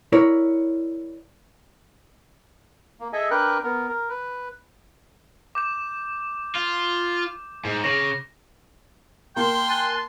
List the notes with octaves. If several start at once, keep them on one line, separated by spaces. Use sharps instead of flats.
E4 A#4 C#5 D5
A#3
G#4 A4 D#5 E5 G#5
D4 A#4 B4 G5 F#6
B3 A#4
A#4
B4
D6 G6 E7
F4
G#2
C#3 A#6
A#3 G5 A5 C6
G#5 F#6 A6